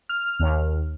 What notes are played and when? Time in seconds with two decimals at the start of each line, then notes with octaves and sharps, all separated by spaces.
0.09 F6
0.40 D#2